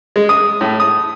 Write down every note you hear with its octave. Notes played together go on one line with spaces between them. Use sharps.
G#3
D#6
A2
D#6